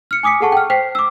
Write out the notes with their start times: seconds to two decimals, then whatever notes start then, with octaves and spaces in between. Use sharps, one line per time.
0.11 F6 C#7
0.23 G#5 D6 D#6 B6 C#7
0.40 G#4 A4 F#5 A5 C#6
0.52 G5 F6
0.70 C5 G5 B6 C7
0.95 D6 E6